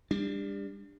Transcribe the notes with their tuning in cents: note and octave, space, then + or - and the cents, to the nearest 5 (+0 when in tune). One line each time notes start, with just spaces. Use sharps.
G3 +35 D4 +0